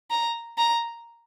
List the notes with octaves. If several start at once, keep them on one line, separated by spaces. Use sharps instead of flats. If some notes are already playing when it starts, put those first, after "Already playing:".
A#5
A#5